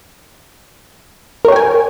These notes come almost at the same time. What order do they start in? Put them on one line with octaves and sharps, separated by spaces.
A#4 C#5 G5 G#5